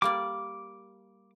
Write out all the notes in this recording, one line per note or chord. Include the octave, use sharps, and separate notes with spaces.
G3 A#3 D5 D6